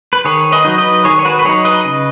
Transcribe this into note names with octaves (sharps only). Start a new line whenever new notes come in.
B4
D#3 G#4 C#5
B4 D#5
F#3 D#4
B4 D#5
D#3 G#4 C#5
C#5
F#4 B4
B4
F#3 D#4 G#4 C#5
B4 D#5
C#3